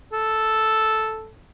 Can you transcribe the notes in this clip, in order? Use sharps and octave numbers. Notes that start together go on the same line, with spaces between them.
A4